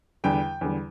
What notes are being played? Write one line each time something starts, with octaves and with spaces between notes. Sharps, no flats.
E2 D3 G3 G5
E2 D3 G3